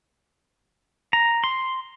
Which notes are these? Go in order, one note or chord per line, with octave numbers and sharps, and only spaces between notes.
A#5
C6